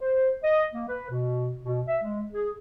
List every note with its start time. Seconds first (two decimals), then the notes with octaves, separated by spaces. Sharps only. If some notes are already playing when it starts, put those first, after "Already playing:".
0.01 C5
0.44 D#5
0.74 A#3
0.88 B4
1.10 B2
1.63 B2
1.88 E5
2.03 G#3
2.33 G#4